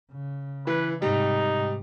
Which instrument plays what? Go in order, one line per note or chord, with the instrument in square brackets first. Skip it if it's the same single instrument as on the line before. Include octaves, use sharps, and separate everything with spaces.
[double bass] C#3
[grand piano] E3 [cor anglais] B4
[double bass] G#2 C3 [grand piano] G3 [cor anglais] D#4